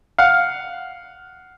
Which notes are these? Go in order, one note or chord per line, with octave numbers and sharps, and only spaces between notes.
F5 F#5